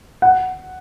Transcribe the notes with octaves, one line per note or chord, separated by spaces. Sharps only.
F#5